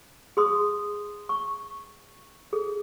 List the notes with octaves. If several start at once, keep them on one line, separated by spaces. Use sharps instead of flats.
G#4 C6 D#6
C#6
G#4 A4